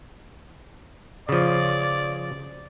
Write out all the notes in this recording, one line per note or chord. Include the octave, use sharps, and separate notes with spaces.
C#3 F3 D5